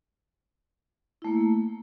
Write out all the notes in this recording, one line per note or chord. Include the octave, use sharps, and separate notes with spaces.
A3 A#3 E4